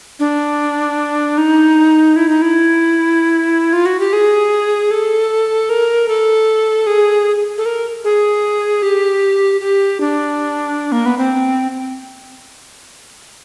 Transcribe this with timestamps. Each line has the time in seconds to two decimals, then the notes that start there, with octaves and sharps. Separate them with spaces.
0.20 D4
1.38 D#4
2.16 E4
2.29 D#4
2.42 E4
3.73 F4
3.86 F#4
4.00 G4
4.13 G#4
4.91 A4
5.70 A#4
6.08 A4
6.87 G#4
7.58 A4
7.66 A#4
8.04 G#4
8.82 G4
9.61 G4
10.00 D4
10.92 A#3
11.06 B3
11.18 C4